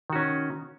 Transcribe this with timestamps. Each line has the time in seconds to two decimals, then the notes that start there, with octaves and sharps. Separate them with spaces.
0.10 D#3
0.13 F#4
0.16 C#4